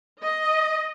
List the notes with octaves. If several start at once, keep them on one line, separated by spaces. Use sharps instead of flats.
D#5